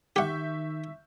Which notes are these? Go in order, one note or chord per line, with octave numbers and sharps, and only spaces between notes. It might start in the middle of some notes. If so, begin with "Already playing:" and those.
D#3 G4 E5 F#5 C#6 G6